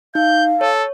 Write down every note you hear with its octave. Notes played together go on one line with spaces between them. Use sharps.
D#4 F5 G6
A4 C#5